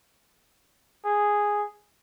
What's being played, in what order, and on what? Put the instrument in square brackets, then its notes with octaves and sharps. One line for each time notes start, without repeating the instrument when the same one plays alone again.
[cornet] G#4